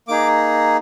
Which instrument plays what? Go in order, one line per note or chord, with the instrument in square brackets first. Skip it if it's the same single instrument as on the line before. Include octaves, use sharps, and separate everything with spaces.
[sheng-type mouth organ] A#3 D#4 G#4 D6